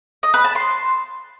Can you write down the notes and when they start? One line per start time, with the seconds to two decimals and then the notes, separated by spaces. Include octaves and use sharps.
0.23 D#5
0.34 B4
0.44 A5
0.55 C6